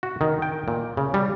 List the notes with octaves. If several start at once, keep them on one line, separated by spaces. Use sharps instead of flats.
F#4
D#3
G5
A#2
C#3
G3